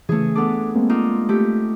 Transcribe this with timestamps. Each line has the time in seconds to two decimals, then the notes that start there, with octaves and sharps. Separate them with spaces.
0.09 C#3 E3 A3 G#4
0.35 B3 D4 A4 D6
0.75 G#3 A#3 C4
0.89 D4 D#4 F4
1.29 A3 G4